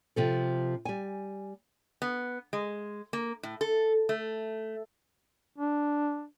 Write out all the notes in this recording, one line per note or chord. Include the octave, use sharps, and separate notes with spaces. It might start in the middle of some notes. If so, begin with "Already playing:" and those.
C3 F3 A4
G3 G#5
B3
G#3
A#3
A2
A4
A3
D4